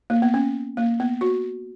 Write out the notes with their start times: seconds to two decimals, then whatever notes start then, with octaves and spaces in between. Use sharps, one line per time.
0.10 A#3
0.22 B3
0.34 C#4
0.77 A#3
1.00 B3
1.21 F#4